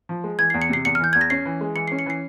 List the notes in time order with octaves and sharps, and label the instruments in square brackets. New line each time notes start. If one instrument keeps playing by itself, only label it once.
[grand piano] F3
G#3
[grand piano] E3 [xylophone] G#6
[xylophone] C7
[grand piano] E2
[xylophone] C#7
[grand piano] C3 [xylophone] C7
[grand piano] E2 [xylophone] C#7
[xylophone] F6
[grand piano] E3 [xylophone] G6
[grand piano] E2 [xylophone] G#6
[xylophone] A#6
[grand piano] C#4 [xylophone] C7
[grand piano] E3
G#3
[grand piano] E3 [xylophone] C#7
[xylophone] C7
[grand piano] C#4
[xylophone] C#7
[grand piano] E3 [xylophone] C7